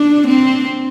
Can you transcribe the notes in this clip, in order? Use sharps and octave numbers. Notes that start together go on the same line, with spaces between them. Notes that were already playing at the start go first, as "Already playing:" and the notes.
Already playing: D4
C4